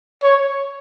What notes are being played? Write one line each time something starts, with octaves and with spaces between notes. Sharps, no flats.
C#5